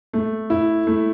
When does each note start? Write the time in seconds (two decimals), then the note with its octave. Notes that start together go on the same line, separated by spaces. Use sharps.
0.13 A3
0.50 E4
0.87 A3